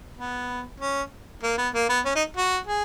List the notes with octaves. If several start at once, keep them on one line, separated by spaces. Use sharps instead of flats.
B3
C#4
A#3
B3
A#3
B3
C#4
D#4
F#4
G#4